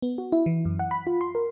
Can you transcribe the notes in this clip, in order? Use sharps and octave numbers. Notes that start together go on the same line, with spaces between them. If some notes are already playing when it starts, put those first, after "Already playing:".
B3
F#4
E4
E3
F#2
F#5
B5
F4
C6
A#4